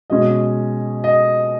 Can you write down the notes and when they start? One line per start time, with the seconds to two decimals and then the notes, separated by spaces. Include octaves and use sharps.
0.10 B2 G#3 C#4 D#5
1.04 D#5